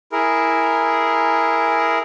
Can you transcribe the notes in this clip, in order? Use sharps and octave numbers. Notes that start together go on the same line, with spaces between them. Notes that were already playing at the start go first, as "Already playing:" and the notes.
E4 G#4 A#4